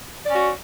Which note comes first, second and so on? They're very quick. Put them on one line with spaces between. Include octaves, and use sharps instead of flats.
D5 C#4 F#4